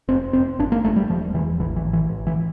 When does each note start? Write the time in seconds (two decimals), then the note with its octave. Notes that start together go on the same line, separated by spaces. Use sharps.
0.08 F1 C4
0.33 F1 C4
0.59 G1 D4
0.72 A#3
0.84 G1 A3
0.96 G3
1.09 E1 F3
1.34 E1 E3
1.60 A1 E3
1.76 E3
1.85 A1
1.93 E3
2.10 A1
2.27 E3